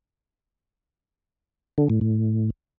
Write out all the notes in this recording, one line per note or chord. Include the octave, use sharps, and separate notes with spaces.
D3
A2
A2